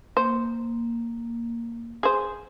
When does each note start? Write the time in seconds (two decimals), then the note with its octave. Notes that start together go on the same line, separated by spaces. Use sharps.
0.17 A#3 C5
2.03 G#4 C5